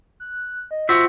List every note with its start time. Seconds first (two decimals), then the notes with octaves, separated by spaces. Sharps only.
0.20 F#6
0.71 D#5
0.89 F4 F#4 C5 E5